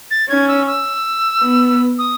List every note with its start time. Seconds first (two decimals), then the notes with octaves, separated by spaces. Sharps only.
0.11 A6
0.29 C#4 G#6
0.48 E6
0.67 E6
1.41 B3
1.98 D#6